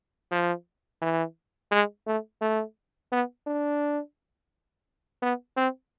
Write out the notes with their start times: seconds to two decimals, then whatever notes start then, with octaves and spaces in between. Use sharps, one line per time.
0.31 F3
1.01 E3
1.72 G#3
2.07 A3
2.41 A3
3.12 B3
3.47 D4
5.22 B3
5.57 C4